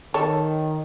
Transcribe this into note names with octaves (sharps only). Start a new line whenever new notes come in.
D#3 A4 C#5